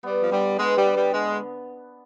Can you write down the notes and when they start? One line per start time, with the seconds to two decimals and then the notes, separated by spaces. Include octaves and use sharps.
0.03 G3 B3
0.21 F3
0.31 D3 G3
0.58 G#3 B3
0.76 G3
0.85 B3
0.95 G3
1.13 D3 G#3